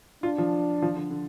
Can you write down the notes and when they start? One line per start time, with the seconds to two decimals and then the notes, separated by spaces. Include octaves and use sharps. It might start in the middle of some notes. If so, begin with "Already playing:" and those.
0.23 D4 F4
0.38 F3
0.82 F3
0.96 D3
1.10 D3